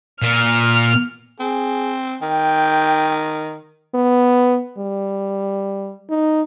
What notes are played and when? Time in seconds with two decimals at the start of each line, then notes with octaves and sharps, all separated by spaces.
0.22 A#2 F6
1.40 C4 G#4
2.22 D#3 G5
3.94 B3
4.78 G3
6.10 D#4